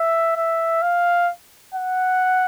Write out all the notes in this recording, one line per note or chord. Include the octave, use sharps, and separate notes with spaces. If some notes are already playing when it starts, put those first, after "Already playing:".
Already playing: E5
E5
F5
F#5